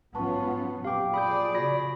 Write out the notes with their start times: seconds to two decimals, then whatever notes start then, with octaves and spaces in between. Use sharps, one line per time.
0.15 G#2 F3 F#3 B3 C#4 F4 A5 C#6
0.84 F2 A#2 F#3 G4 F5 G5 D6
1.14 F3 G#4 D5 B5 D#6 G6
1.55 C#3 F#4 B5 A#6